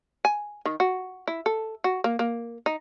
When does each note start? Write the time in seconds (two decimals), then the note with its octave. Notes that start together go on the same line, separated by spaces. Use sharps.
0.25 G#5
0.65 D#3
0.80 F#4
1.28 E4
1.46 A4
1.84 F#4
2.04 A#3
2.19 A#3
2.66 D#4